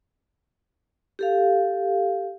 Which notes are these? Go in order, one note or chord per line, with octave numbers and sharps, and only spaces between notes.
G4 A4 F5